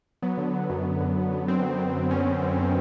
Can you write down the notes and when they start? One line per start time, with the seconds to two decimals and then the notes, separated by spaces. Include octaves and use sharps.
0.22 F#3 B3
0.37 D3
0.54 F#3
0.69 F#2
0.85 F#2
1.01 F#2
1.16 F#2
1.33 D3
1.47 F#2 C4
1.63 D3
1.79 F#3
1.94 F#2
2.11 F#2 C#4
2.27 F#2
2.42 F#2
2.58 D3